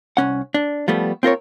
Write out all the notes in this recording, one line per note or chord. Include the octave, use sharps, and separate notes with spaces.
C2 C#4 F#5
D4
F3 G3 A3 B3
C4 F4 A#4 C#5